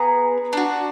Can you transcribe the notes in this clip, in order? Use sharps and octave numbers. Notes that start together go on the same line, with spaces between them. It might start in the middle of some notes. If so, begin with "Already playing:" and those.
Already playing: B3 G#4 A#5
D4 F#4